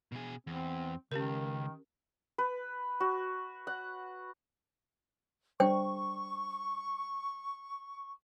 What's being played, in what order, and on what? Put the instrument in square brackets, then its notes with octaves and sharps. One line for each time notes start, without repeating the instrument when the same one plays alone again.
[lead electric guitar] B2 G#4
[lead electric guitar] E2 [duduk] C4
[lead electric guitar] C#2 [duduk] D#3 [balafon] C#4 G4 A#4
[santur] B4
F#4
F#5
[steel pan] G3 D4 [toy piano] C5 G5 [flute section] C#6